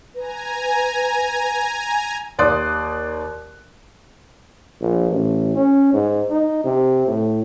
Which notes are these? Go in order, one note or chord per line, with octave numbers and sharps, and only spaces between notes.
B4 G#5 A#5
D#2 D5 C6 D#6 F#6
A#1
A1
C#4
G#2
D#4
C3
A2